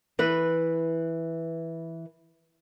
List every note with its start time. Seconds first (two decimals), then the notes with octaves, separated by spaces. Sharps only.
0.19 E3 B4